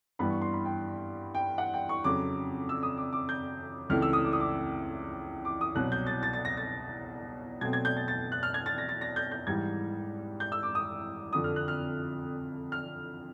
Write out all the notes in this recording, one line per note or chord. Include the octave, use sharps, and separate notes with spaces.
G2 E3 G3 B3 B5
C#6
C6
B5
G5
G5
F#5
G5
C#6
F2 C#3 F#3 D6
E6
D#6
D6
D6
G6
C#2 C3 E3 A3 F6
E6
D#6
D6
D#6
D6
D6
D#6
C2 B2 F#3 F#6
G6
A6
A6
A6
A#6
A6
B2 F#3 A3 C4 G#6
G#6
G6
A6
A6
F#6
F6
G#6
A6
A#6
A6
A#6
G6
G6
G#2 E3 G3 G#6
G6
E6
D6
D#6
F2 D3 F3 D#6
F6
F#6
F6
F6